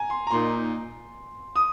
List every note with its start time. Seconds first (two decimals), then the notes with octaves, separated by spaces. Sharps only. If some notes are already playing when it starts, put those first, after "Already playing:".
Already playing: G#5 A#5
0.10 C6
0.27 A#5
0.31 A#2 A#3 D#4 C6
1.56 D#6